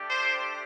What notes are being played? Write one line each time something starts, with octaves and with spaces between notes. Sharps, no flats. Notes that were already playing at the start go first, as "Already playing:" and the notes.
Already playing: A3 D4 G4
C5